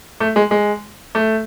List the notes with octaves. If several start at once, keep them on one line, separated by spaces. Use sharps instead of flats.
A3
G#3
G#3
A3